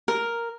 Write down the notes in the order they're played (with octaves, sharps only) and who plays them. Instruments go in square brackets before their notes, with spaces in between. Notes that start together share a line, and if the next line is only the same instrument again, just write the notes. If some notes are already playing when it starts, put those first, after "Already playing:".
[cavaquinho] A#4